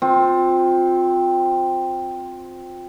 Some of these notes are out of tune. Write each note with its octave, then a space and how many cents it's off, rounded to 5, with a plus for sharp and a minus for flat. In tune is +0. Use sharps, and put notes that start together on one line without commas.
C4 +0 F4 +25